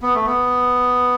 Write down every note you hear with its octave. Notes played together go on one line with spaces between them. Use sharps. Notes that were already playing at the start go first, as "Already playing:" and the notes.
B3
A3
B3